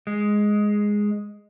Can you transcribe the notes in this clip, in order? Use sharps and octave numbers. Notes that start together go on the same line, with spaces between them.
G#3